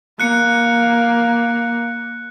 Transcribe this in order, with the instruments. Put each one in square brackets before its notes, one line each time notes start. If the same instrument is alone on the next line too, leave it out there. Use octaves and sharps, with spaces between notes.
[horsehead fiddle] A#3 [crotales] F#6 C#7